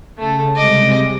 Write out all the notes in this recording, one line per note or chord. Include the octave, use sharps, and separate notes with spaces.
C#3 A3 A4
C3 G3 G#3 D#5 D6